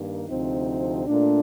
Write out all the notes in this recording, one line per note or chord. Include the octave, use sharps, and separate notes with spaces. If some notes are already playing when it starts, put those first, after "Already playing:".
Already playing: G2 D#3 A#3
D2 C3 F3 C4 D#4
A#2 A3 D4